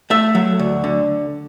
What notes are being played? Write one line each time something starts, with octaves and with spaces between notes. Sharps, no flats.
A3 E5
F#3
D2
D3